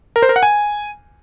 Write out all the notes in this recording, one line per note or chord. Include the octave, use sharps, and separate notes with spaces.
A#4
C5
A#4
F#5
G#5